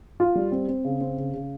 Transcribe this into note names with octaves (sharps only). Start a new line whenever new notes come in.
F4
G3
C4
C4
C#3
C4
C#3
C#3